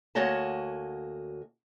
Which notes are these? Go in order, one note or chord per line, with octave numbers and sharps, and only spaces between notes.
D2 A#3 F#4 C#5 D#5 A5